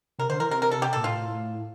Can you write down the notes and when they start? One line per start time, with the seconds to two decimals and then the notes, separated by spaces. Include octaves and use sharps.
0.19 C3 A#4
0.29 D3 C5
0.40 E3 A#4
0.51 C3 A#4
0.62 A#4
0.71 A4
0.82 G4
0.93 A#2 A4
1.03 A2 F4